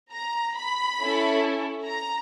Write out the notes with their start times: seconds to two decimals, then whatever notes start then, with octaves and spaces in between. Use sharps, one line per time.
0.12 A#5
0.56 B5
1.00 C#4 E4 A4
1.87 A#5